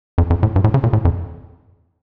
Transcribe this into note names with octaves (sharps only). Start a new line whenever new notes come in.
F2
F2
A2
G2
A2
C#3
A#2
A2
F2